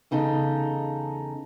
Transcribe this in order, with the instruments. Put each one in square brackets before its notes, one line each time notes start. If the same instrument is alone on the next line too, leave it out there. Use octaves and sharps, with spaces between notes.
[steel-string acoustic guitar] E2 C#3 D#4 A4